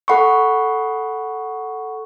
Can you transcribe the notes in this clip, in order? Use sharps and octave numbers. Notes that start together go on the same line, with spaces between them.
A4 F#5 B5 C#6